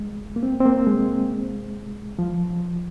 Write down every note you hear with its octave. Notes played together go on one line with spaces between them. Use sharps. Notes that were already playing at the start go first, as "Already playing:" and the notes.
Already playing: G#3
A#3
C4
C4
A#3
G#3
F3